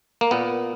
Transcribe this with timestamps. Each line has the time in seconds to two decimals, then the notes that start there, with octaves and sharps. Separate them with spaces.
0.21 A#3
0.31 A#2 B3